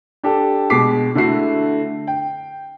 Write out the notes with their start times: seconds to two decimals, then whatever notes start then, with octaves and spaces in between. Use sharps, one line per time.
0.24 D4 G4 A4
0.70 B2 G#3 F#4 D6 B6 C7
1.15 D3 A3 E4 F#4 C7
2.07 G5